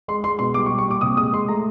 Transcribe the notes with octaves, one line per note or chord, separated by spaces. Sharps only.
G#3 C6
G#3 C6
B2 C6
G3 D6
C#6
G3
C#6
A#2 D6
C3 D#6
G#3 D#6
G#3 C6
A3 A#5